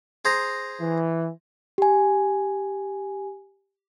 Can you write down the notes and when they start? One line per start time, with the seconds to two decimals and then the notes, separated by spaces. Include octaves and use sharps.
0.25 G#4 C5 A#5
0.81 E3
1.78 G4 G#5